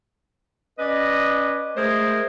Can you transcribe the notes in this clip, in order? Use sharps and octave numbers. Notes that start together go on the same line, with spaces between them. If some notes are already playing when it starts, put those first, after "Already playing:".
C#4 B4 D5 D#5
G#3 A3 G#4 A#4 C5